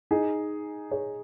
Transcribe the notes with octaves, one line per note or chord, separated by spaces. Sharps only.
D#4 G#4
G#4 C#5